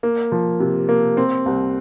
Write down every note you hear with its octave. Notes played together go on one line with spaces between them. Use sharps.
A#3
F3
C3
A#3
C4
C2